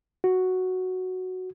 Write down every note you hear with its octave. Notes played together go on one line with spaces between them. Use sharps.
F#4